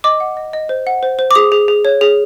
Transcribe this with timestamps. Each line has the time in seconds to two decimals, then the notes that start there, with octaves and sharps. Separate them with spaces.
0.04 D#5 D6
0.20 F#5
0.37 D#5
0.53 D#5
0.69 C5
0.87 F#5
1.03 C5
1.19 C5
1.31 D6
1.35 G#4 D#6
1.52 G#4
1.68 G#4
1.85 C#5
2.01 G#4